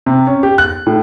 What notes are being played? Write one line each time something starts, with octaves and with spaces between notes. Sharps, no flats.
C3
C#4
G4
F#6
A2